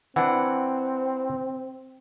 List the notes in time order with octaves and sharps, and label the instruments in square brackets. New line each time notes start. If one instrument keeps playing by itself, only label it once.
[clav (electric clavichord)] E3 D4 [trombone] C4 [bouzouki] F#5